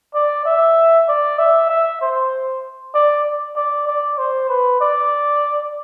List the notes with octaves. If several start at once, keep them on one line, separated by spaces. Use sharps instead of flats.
D5
E5
D5
E5
E5
C5
D5
D5
D5
C5
B4
D5